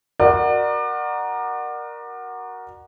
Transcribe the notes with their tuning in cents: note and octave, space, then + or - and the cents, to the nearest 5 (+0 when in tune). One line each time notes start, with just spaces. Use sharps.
F#4 +0 A#4 +10 D5 +30